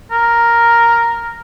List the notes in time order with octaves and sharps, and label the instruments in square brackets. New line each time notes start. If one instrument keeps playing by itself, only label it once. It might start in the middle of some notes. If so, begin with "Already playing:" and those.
[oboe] A#4